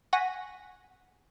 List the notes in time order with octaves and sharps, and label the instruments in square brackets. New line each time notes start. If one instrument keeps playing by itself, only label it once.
[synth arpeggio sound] F#5 G#5 C#6 A#6 B6 D#7